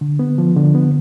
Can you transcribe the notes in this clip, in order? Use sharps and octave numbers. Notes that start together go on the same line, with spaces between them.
D3
B3
F3
D3
B3